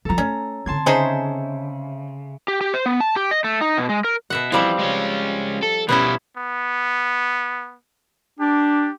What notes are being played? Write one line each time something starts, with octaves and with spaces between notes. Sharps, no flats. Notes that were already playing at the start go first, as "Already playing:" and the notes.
G2 F3 A4 A#5
A3 C#4
D3 C4 A5 C6 G#6
C#3 D#4 G#4 C5 C#5 E5
G4
G4
C5
B3
A5
G4
D#5
A3
D#4
B2
G#3
A#4
B2 E5 F#5
E3 F3 G3 C4
G#3 C#4
A4
B2 G3 B3 C#4 E4
B3
D4 G4